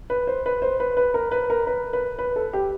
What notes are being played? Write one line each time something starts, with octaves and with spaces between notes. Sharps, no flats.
B4
C5
B4
C5
B4
B4
A#4
B4
A#4
B4
B4
B4
A4
G4